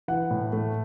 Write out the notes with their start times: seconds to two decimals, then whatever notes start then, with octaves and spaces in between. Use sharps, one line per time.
0.08 E3 F#5
0.31 A2
0.52 A3